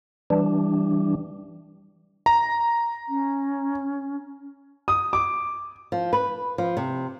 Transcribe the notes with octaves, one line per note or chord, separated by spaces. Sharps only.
E3 G3 D4
A#5
C#4
D#6
D6
F3
B4
F3
C3